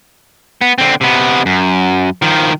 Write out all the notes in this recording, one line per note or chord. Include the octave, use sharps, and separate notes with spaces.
B3
D3 C4
C3 B3
F#2
D#3 F3